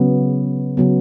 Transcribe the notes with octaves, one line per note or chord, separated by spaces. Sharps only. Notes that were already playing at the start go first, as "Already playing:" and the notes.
Already playing: C#3 F#3 B3
C#3 F#3 B3